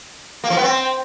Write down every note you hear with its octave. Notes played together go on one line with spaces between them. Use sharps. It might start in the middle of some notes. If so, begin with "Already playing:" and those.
A#3
F3
B3
C4